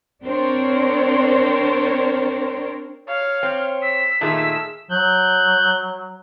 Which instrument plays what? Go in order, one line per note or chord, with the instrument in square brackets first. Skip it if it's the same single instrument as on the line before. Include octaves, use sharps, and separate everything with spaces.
[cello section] C4 D4 A#4 C5 C#5
[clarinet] C#5 [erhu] F5
[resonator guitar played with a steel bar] C4
[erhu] E6 [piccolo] B6
[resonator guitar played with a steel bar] A#2 D#3 A3 [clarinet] G#4 [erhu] E6
[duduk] F#3 [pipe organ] F#6 G6